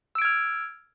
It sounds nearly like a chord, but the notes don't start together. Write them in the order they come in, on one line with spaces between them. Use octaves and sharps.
E6 D7 G#6 F6